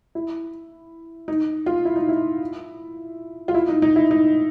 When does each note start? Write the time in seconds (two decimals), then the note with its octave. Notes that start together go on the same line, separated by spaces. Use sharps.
0.15 E4
1.28 D#4
1.66 F4
1.85 E4
1.96 D#4
2.09 E4
3.48 F4
3.54 E4
3.69 D#4
3.82 D#4
3.96 E4
4.11 D#4